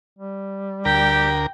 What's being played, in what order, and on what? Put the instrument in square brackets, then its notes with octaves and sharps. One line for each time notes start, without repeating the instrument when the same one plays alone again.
[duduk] G3
[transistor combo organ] D2 A#4 [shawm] G4 [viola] G5